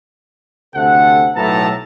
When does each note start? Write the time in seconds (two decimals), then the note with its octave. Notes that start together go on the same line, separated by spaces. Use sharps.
0.75 D2 C3 A4 F#5
1.35 B1 A2 B3 A4 A5 A#5